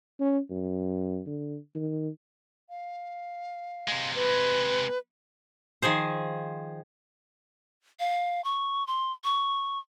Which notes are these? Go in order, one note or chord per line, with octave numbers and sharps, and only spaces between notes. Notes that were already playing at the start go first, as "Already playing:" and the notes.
C#4
F#2
D3
D#3
F5
C3 G#3
B4
D#3 F3 G#4 C5
F5
C#6
C6
C#6